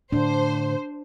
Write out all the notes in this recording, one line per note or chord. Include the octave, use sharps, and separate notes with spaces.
A2 D3 D4 C5